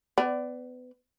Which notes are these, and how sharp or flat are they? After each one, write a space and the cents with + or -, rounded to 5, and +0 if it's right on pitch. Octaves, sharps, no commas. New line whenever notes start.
B3 +30 D5 +0